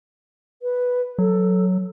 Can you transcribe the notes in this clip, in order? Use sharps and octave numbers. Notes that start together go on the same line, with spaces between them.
B4
F#3 A4